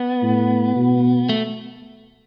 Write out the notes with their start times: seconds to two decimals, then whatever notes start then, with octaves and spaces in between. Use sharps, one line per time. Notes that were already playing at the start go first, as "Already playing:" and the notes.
Already playing: B3
0.23 A2
0.76 B2
1.29 A3